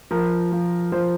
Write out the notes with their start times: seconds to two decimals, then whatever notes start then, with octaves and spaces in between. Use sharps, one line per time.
0.11 F3 A#4
0.52 F3
0.92 F3 C5